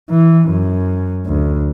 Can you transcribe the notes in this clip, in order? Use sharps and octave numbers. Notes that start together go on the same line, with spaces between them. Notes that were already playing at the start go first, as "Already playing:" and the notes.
E3
F#2
D2